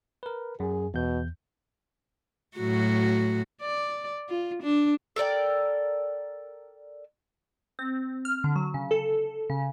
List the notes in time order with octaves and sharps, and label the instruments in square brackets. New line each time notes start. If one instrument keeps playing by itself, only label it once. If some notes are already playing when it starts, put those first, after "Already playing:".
[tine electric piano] A#4 B4
[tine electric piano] F#2 [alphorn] G#4
[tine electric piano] E2 G6 [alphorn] B2
[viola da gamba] A2 F#3 F#4
D5
F4
D4
[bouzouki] A4 A#4 D5 G5
[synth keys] C4
F6
D3
F#3
C#3
A4
C#3